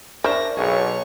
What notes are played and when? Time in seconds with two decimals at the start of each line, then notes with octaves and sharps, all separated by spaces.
0.24 D4 A#4 C5 E5 C#6 A#6
0.57 B1 G#4 C#5 C#6